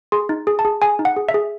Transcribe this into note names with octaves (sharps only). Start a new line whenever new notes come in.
G#4 C6
D#4
G#4
A5
G#4
G#4 G#5
D#4
F#5
G#4
E5
G#4